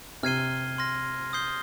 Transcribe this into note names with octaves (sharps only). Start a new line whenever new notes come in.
C3 F6 G#6 C7 D#7 G7
C6 F6 A#6
D#6 G6 C7 G7